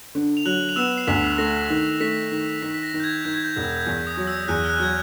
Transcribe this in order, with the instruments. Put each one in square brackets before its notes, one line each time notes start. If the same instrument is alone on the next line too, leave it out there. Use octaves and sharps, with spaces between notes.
[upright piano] D3
[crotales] F7
[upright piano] F#3 [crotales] F#6 F#7
[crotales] F7
[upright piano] B3 [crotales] E6 E7
[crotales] C7
[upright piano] D2 [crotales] B6
[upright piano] A3 [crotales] A#6
[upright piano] D#3
[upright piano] A3 [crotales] B6
[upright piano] D#3
[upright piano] D#3 [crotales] B6
[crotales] B6
A#6
[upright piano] D#3
[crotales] G6
G#6
[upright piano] D#3 [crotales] G6
[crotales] G#6
G6
[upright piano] E1
E2
[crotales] D#6
[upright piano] F#3
[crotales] E6
[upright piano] E2 [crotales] F#6
[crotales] F6
F#6
[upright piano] F#3 [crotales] G#6